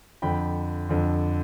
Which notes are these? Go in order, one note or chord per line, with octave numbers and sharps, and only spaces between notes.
F2 D3 G5 B5
F2 D3